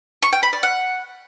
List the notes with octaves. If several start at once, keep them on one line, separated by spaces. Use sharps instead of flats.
C#6
G5
B5
D5
F#5